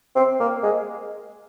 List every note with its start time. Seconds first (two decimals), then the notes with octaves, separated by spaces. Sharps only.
0.16 C4
0.40 A#3
0.63 G#3